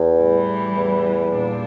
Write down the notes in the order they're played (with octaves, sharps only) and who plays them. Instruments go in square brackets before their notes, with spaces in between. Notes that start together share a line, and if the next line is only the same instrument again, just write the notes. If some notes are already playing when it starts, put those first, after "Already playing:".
Already playing: [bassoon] E2
[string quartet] A2 E3 G3
[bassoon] E2
[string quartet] A#2 G3 D4